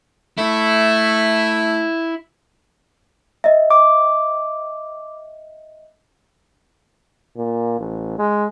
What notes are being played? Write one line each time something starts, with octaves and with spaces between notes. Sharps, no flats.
A3 E4
D#5 E5
D6
A#2
A1
G#3